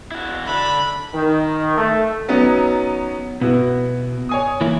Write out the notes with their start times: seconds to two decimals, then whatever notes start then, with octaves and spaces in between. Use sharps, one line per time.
0.12 E4 F#4
0.46 D3 B5
1.14 D#3
1.77 A3
2.28 F#3 B3 C#4 D#4
3.41 B2 B3 E4 F#4
4.29 C#5 G#5 D#6
4.61 E3 A#3 E4